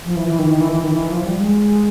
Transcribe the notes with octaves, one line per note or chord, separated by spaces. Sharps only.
F3
E3
E3
D#3
D#3
E3
E3
D#3
E3
F3
G3
G#3